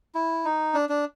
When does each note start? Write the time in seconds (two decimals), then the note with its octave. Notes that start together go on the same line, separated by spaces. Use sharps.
0.15 E4
0.45 D#4
0.74 D4
0.89 D4